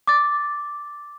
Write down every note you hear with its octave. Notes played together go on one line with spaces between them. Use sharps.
D6 A6